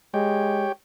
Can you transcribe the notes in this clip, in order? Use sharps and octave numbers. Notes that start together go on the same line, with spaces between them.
G#3 G4 C#5 G5